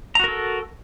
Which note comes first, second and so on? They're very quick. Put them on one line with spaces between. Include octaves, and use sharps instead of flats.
A#5 F#4 A#4 A4